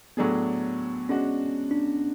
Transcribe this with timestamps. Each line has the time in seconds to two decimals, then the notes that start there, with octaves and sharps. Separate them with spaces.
0.17 A2 F#3 A3 B3 D4 G#4
1.09 G#3 C#4 D4 F#4
1.71 D4